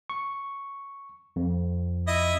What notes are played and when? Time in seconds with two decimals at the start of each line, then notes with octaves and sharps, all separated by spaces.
0.10 C#6
1.36 F2
2.07 E4 D#5